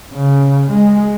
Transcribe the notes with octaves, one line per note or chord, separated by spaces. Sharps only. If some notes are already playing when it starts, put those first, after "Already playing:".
C#3
G#3